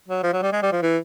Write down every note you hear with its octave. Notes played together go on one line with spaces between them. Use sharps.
F#3
F3
F#3
G3
G#3
G3
F3
E3